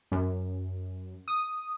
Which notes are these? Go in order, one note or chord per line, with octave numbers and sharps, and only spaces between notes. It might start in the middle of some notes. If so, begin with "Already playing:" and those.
F#2
D#6